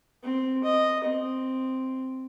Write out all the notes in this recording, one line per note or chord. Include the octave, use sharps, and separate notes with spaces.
C4
D#5
C4